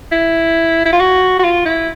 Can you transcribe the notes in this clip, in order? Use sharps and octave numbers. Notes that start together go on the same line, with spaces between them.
E4
E4
F4
F#4
F#4
F4
E4